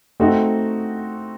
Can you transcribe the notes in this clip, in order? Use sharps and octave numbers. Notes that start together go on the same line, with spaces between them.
A3 C4 D#4 F#4